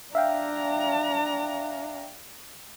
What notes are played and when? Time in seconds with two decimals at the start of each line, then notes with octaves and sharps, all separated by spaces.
0.15 D4 E5 F5 G5 A#5